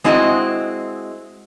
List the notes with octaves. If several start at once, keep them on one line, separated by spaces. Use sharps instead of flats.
G#3 C4 E4 F#4 C#5 D#5